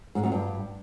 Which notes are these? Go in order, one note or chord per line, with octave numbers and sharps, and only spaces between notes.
G#2
F#2
G2